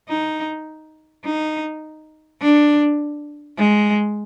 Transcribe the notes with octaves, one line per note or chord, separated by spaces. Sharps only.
D#4
D#4
D4
G#3